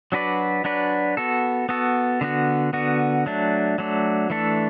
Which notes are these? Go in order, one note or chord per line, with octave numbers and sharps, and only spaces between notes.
F#3 D4 F#4 B4 D5
F#3 D4 F#4 B4 D5
B3 F#4 A4
B3 F#4 A4
D3 B3 F#4
D3 B3 F#4
F#3 A3 D4
F#3 A3 D4
E3 A3 D4 A4